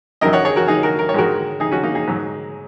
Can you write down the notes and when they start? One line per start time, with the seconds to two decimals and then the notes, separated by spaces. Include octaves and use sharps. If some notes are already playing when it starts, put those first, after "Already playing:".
0.21 F#2 D#3 F#3 A#4 D#5
0.33 C#5 F#5
0.45 G#4 C#5
0.56 F#4 A#4
0.68 D#4 G#4
0.83 F#4 A#4
0.99 A#4
1.09 C#5
1.14 G#2 D#3 G#3 F#4 A#4
1.60 D#4 G#4
1.72 C#4 F#4
1.83 A#3 D#4
1.95 D#4 G#4
2.07 G#2 F#3